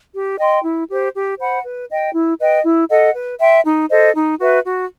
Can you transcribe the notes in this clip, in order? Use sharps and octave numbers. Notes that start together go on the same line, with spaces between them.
G4
D#5 G5 C6
E4
G4 C5
G4
C5 F#5 B5
B4
D#5 G5
E4
B4 D#5 G5
E4
A4 D#5 F#5
B4
E5 G5 C6
D#4
A4 C5 D#5
D#4
F#4 B4 E5
F#4